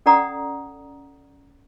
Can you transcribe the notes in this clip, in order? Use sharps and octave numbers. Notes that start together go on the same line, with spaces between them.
C#4 A4 D5 F#5 A#5 D#6